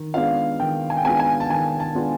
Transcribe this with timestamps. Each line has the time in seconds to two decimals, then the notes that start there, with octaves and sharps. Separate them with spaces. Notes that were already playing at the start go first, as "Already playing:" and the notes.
Already playing: D#3
0.14 G#3 B3 D4 F4 F5
0.60 D#3 G5
0.90 G#5
0.97 G5
1.04 G#3 B3 D4 F4 G#5
1.20 G#5
1.40 A5
1.50 D#3 G#5
1.80 A5
1.95 G#3 B3 D4 F4